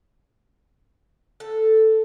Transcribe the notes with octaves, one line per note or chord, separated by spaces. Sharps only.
A4